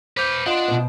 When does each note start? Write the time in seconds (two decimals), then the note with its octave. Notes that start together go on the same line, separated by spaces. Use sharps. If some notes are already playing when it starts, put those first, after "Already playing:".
0.17 B4 C5 F5 D6 G6
0.46 D4 F4 D#5 F5 F#5 C6
0.68 B2 C5